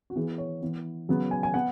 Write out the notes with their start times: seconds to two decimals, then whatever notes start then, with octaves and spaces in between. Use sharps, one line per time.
0.10 F#4
0.16 E3 B3 G#4
0.38 C#5
0.62 E3 B3
1.09 C#3 F#3 B3
1.31 G#5
1.43 G#5
1.54 B3 F#5